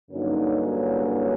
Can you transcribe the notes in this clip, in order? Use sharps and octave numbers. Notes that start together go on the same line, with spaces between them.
G2 D3 F#3 A#3 C#4 D#4
E4